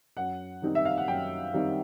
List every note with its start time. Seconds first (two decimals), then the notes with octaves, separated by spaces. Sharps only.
0.17 F#2 F#5
0.62 D#3 G3 C4 D#4
0.75 E5
0.85 F5
0.98 F#5
1.08 F#2 G5
1.54 D#3 G3 C4 D#4